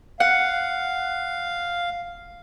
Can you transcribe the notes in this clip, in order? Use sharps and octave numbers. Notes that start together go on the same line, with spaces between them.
F5 F#5